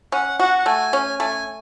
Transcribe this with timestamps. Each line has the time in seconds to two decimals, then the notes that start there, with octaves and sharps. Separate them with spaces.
0.12 C#4 F#5
0.39 F#4 F#5
0.58 F#5
0.66 A3 G#5
0.93 C#4
1.20 A3 G#5